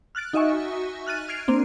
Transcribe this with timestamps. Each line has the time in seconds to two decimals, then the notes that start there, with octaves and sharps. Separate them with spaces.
0.15 F6 F#6 A6 D7
0.33 D#4 F#4 D#5 E5 G#5 C#6
1.07 F6 F#6 A6 D#7
1.28 F6 G#6 C7 D7 F7
1.48 A#3 C4 D4